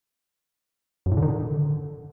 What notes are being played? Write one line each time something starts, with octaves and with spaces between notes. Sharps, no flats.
F#2
A2
D3
D#3
D3